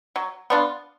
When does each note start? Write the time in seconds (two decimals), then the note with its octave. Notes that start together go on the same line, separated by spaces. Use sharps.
0.16 F#3
0.50 B3 D4 F4